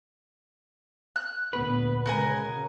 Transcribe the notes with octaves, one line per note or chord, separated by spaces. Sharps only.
F#6
D2 A#2 B3 B4
C#3 G#3 F#4 A#4 G#5